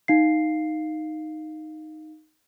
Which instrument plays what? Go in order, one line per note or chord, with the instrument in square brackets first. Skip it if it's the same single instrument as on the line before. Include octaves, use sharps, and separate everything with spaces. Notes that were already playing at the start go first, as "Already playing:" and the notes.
[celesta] D#4 F5 C7